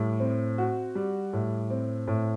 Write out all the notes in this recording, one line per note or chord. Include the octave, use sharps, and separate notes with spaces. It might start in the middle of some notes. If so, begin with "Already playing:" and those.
Already playing: A2 G3
C4
F#4
G3
A2
C4
A2